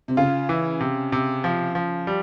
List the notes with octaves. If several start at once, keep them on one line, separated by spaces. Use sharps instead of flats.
C3
C#3 F4
E3
C3
C3
F3
F3
G3